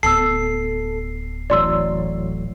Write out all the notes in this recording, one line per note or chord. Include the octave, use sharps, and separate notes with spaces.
D1 B3 A4 A5 E6 C7
A1 A2 F#3 D5 C6 E6